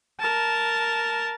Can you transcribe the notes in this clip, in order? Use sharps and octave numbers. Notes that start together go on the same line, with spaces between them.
A#4 A5